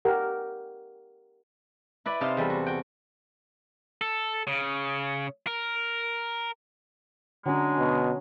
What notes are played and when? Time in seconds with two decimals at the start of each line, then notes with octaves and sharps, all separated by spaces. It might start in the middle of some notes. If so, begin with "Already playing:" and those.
0.05 G4 A#4 F#5
2.05 E4 B4 D5 B5
2.21 C3 D#4 C5 F5 A5 C6
2.37 E2 G3 A4
2.50 F#4
2.66 F#4 G5
4.01 A4
4.47 C#3
5.47 A#4
7.46 D3 F#3 G#3 C#4 D4
7.78 B2